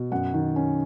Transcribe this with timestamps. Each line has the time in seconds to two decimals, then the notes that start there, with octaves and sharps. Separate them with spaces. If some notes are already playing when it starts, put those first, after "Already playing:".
Already playing: B2
0.12 F#2 F#5
0.34 D#3
0.56 C#4